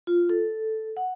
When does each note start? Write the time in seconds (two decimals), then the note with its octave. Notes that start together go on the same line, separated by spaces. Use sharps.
0.07 F4
0.29 A4
0.97 F#5